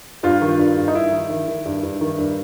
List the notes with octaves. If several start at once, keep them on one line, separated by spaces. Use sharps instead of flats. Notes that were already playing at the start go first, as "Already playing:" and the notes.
G2 F4
D#3
G2
G2
D#4
G2 E4
D#3
D#3
D#3
G2
G2
D#3
G2